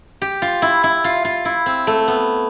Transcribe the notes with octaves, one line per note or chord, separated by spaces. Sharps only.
G4
F4
E4
E4
F4
F4
E4
C4
A3
B3